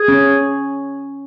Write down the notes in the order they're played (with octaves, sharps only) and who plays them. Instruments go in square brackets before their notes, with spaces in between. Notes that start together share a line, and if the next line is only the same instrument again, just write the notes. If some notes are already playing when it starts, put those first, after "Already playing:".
Already playing: [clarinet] G#4
[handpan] C#4